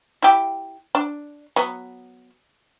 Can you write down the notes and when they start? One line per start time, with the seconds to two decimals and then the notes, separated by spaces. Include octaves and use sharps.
0.22 E4 G4
0.95 D4
1.56 F#3 B3